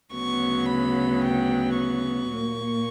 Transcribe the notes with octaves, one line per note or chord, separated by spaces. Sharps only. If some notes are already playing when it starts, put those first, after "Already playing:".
D2 C#3 F#3 B3 C#6
B5
G5
C#6
A#2 A#3